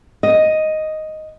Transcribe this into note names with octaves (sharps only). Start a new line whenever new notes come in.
D#5